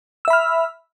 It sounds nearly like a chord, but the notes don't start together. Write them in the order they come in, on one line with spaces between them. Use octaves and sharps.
E6 E5 B5 F6